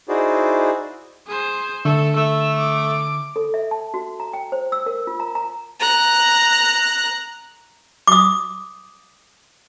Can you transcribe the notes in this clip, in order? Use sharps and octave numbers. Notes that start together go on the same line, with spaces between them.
D#4 E4 F#4 G#4 C5 D5
G#4 C5
D3 A3 A4
A3 E6
D6
A4
E5
A5
F#4
A#5
G5
C5
E6
A#4
F4
A#5
A#5
A#5 F#6
D6 D#6